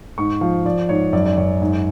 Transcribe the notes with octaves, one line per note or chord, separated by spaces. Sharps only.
G#2 C#6
F3 F5
F3 D5
G#2 C#5
F#2 D5
D5
F#2 C#5
G#2